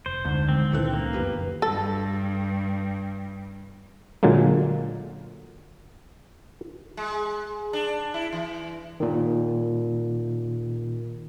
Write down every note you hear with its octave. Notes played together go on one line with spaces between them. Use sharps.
F1 C5
D2 G#2 D3
D#3 G#3 C4
C#2 A#2 D#3 E3 C#4 A4 F#6
A#3
F#1 F2 B3 D4 G4 B4
G2 A4
A#2 D3 F#3 G#3 A#3
G#3
D4
E4
E3
A#2 D#3